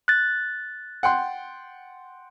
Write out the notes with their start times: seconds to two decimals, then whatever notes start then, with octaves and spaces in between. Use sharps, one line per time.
0.08 F#6 A6
1.03 F#5 G5 C6